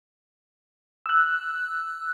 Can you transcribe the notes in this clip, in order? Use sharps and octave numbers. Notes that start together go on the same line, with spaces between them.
E6 F#6